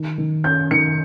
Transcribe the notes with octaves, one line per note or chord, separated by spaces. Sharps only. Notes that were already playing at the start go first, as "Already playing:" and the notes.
Already playing: D#3
D#3
C#4 G6
D#3 C#7